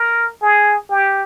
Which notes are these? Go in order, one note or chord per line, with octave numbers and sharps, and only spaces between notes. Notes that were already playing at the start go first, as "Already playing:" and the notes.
Already playing: A#4
G#4
G4